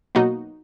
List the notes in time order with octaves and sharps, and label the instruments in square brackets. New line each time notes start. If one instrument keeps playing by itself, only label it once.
[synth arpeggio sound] B2 F#3 A#3 D#4 F#4